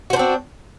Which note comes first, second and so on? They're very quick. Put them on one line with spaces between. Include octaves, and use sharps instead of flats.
F#4 C5 D4 C4